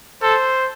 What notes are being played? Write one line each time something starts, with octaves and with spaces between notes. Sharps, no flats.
A4 C5